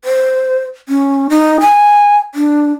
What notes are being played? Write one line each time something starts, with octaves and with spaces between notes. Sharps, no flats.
C5
C#4
D#4
G#5
D4